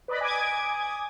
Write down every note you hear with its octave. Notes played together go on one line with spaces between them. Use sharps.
B4 D5 D#5 B5
G#5 D6 D#6 G#6